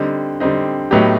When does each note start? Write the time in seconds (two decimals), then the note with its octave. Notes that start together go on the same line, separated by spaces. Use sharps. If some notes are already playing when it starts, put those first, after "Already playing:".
Already playing: D3 G3 C4 D#4
0.40 D3 G3 C4 D#4
0.91 A2 F#3 B3 D#4 G4